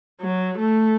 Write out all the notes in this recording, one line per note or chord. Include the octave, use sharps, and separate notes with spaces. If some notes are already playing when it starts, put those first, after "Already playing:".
F#3
A3